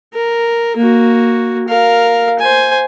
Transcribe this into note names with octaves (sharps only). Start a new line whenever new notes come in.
A#4
A#3 F#4
A#4 F5
C5 G#5